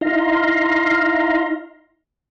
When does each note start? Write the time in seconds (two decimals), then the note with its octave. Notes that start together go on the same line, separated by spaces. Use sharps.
0.01 D#4 E4 F5 A#5 C6